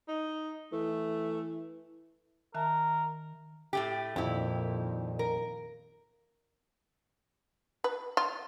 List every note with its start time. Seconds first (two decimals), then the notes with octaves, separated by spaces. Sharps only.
0.08 D#4
0.72 E3 A3
2.54 D#3 A#4 E5 A5
3.73 A2 A3 G4
4.16 F2 A#2 D#3 E4 G4
5.19 A#4
7.84 B4
8.17 F4